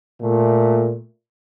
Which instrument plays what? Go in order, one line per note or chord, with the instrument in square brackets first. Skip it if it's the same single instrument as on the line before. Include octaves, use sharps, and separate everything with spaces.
[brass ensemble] A#2 A3